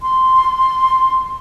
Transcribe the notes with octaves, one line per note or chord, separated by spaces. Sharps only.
C6